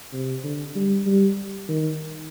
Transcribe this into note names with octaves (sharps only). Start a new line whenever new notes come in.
C3
D3
G3
G3
D#3